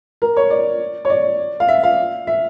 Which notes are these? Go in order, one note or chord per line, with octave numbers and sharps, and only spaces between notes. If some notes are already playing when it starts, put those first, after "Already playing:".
A#4
C#5
D5
C#5
D5
F5
E5
F5
E5